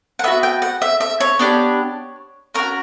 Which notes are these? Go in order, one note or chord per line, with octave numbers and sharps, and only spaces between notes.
F#5
B3 F#4 E5
G5
F#5
E5
E5
C#5
B3 D4 G4
C#4 F#4 A#4